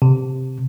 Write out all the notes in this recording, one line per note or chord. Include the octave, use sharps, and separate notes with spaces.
C3